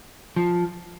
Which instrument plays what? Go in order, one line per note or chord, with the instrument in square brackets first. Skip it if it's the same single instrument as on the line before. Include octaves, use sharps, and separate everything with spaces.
[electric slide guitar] F3